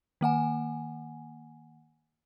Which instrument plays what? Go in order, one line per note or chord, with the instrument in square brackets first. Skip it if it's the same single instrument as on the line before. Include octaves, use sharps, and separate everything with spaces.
[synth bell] D#3 A#3 F#5 G#5